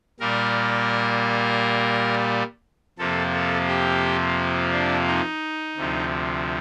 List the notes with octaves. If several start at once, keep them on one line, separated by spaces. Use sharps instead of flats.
A#2 G3 A#3 A#4
F2 C3 F3 A#3 A4
A4
G4
D4
D#4
D2 C3 F3